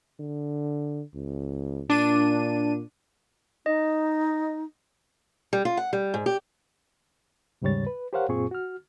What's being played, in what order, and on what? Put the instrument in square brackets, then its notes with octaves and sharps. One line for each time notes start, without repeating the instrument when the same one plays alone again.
[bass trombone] D3
C#2
[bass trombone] A#2 [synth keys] D4 D#7
[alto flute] D#4 [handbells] D#5
[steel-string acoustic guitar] G3
F4
F#5
G3
G#2
G4
[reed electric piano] D#2 G#2 C#3 G3 C#5 A6
B4
G4 A#4 C5 C#5 F5 F#5
F#2 A#2 C4 F4 G#4 C#6
F#4 F6